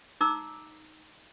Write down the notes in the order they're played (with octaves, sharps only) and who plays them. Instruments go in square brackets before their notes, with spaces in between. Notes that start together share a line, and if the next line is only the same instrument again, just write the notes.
[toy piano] D#4 A#5 D6 E6